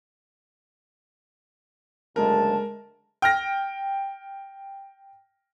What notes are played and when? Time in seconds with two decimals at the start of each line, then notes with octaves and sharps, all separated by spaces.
2.16 F#1 D2 G#3 A#4 A5
3.22 G5 F6 A#6